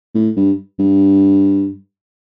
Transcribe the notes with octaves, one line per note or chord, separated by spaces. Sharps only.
A2
G2
G2